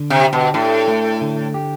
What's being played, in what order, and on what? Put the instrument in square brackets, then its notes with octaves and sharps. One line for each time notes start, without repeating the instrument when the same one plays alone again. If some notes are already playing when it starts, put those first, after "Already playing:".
Already playing: [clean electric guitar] D3
[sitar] C3
[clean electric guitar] G4
[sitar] B2
[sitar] A2 [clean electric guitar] D4
[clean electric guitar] A3
D3
G4